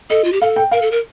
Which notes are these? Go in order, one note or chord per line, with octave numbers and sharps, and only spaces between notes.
A4 D#5
F4
G4
A4 F5
G5
A#4 F5
A4
A#4